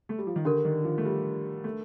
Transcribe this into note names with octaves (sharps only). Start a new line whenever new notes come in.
A3
G3
F3
D#3
D3 D4 G4 A#4
D#3
F3
A3
G3
A3